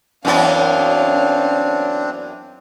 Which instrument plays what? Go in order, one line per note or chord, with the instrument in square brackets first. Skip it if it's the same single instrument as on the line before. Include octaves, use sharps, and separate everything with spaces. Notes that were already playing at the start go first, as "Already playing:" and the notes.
[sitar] F#2 E3 B3 [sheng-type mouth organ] C4 D4 [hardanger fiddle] C#5 F5